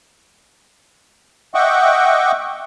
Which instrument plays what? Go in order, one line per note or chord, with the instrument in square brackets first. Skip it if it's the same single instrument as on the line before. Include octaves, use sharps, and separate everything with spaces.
[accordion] D#5 E5 F#5 G5 C#6 D6